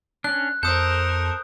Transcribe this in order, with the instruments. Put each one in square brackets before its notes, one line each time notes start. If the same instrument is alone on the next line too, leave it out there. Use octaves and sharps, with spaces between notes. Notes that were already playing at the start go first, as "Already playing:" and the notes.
[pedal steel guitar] C#4 D4 [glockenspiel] F#6
[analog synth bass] F2 [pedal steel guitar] A4 [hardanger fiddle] A#4 C5 [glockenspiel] D#6 G6